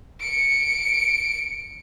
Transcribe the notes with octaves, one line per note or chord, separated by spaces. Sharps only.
C#7 D7